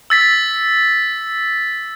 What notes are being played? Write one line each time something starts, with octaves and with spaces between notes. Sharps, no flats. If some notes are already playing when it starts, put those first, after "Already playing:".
E6 A6 B6